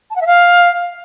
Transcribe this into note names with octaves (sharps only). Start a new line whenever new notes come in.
A5
F#5
E5
F5